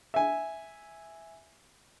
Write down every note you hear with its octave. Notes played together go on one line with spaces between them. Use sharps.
E5 G#5